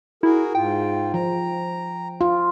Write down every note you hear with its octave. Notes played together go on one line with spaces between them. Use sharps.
E4 F#4 G#4 A#4
G#2 F4 G5
F3 A#5
F4